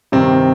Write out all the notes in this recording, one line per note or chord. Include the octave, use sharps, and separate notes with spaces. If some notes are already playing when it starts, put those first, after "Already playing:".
G2 C3 D#3 C4